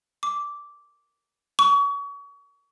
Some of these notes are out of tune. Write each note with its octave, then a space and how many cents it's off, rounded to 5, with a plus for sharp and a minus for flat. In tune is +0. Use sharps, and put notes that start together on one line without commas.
D6 -10
C#6 +35